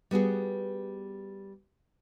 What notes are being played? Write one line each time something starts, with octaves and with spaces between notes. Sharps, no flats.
G3 B3 F#4 G#4